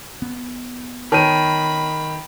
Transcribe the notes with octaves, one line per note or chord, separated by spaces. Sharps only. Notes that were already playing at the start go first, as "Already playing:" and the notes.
B3
D#3 C#5 A5 B5 D#7